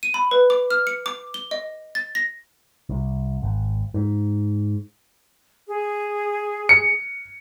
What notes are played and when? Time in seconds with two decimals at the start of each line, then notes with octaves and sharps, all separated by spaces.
0.03 D#7
0.14 B5
0.31 B4
0.50 D6
0.71 F6
0.87 C#7
1.06 D6
1.34 G7
1.51 D#5
1.95 A6
2.15 A#6
2.89 C2
3.42 G#1
3.94 G#2
5.68 G#4
6.69 C#7